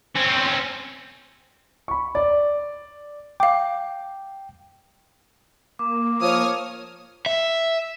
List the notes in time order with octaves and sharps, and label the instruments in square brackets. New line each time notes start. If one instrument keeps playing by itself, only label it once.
[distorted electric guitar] C4 C#4
[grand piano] B5 C#6
D5
[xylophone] F5 D6 [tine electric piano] G5
[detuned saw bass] A#3 [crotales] D6
[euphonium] F3 [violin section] C#5 D#6 F6
[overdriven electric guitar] E5